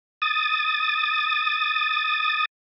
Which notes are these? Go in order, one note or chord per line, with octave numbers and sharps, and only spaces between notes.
D#6 A6